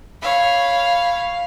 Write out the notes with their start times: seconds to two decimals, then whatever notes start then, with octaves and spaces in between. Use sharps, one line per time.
0.22 C#5 F5 B5